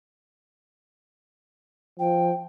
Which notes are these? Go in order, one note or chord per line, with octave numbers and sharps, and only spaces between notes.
F3 G5